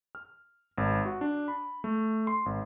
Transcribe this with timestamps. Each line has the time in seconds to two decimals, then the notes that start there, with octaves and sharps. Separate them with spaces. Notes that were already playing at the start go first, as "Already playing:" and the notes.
0.15 F6
0.78 G#1
1.05 F#4
1.21 D4
1.48 B5
1.84 A3
2.27 C6
2.46 G#1